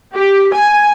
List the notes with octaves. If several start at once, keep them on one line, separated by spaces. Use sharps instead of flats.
G4
G#5